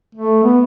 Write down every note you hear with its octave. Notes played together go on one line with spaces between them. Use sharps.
A3
B3